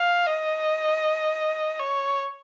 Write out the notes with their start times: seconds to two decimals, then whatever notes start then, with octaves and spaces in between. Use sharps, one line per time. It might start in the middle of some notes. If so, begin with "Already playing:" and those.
Already playing: F5
0.27 D#5
1.80 C#5